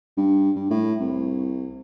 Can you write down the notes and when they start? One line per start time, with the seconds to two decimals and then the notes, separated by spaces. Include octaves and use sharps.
0.17 G2
0.55 G2
0.70 A2
1.00 C2